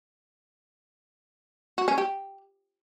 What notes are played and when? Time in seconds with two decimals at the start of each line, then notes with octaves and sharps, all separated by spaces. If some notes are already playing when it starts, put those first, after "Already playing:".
1.78 F#4
1.88 C#4
1.98 G4